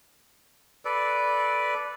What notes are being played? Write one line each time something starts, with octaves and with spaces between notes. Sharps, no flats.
A4 B4 D5